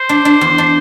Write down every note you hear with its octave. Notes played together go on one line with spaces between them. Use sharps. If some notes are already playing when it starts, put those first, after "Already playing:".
Already playing: C5
D4
D4
E2
D4